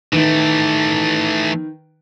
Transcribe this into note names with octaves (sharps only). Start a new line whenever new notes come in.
D#3 E3 A3 B4 D7